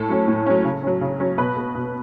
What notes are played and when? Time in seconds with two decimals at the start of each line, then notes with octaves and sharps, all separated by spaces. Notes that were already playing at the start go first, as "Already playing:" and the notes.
Already playing: A2 A4
0.09 F#3 C#4
0.28 A2
0.46 F#3 C#4
0.65 C#3
0.83 F#3 C#4
1.01 C#3
1.20 F#3 C#4
1.38 B2 B4
1.57 B3
1.75 B2